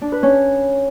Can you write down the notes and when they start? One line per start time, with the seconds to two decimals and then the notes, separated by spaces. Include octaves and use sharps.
0.02 D4
0.12 B4
0.23 C#4